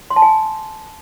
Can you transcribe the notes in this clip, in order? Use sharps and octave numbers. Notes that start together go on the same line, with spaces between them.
C6
A5
G#5